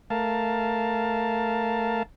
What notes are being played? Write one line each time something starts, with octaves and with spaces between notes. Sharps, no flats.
A3 A#4 F5 A5